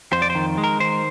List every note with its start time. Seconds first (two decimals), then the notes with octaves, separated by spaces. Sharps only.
0.12 F2 C5
0.22 D5
0.30 C5
0.35 D#3
0.58 G#3
0.64 A#4
0.80 D#3 C5